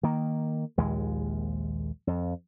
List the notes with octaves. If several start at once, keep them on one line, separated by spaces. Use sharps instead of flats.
D#3 A#3
A#1 D#2 G#3
F2